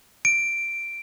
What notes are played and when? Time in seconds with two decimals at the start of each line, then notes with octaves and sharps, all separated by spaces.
0.25 D7